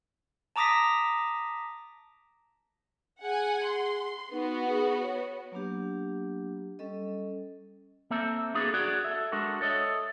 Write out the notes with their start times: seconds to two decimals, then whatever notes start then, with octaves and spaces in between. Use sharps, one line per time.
0.56 A5 A#5 D6 D#6 A#6 B6
3.22 G#4 F#5 G#5
3.64 C6
4.32 B3 D#4 F#4
4.69 G#4
5.02 C#5
5.52 F#3 A#3 B3 D4 G4
6.79 G3 C#4 A4 D#5
8.10 A#3 C4 A4 E5
8.54 A#3 B3 D4 F#4 G#4 A4
8.74 F#4 G#4 D5 F#5
9.04 A4 E5
9.32 G#3 D4 F#4 A4 A#4
9.61 A4 C#5 D#5 E5